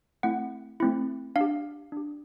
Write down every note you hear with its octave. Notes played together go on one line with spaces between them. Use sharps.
A3 C4 E4 F#5
A3 C4 E4
D4 F5
G4
D4 G4